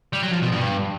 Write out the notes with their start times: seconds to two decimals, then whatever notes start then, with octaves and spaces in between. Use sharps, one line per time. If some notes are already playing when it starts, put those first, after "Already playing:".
0.13 G3
0.23 F#3
0.33 F3
0.42 B2
0.52 G2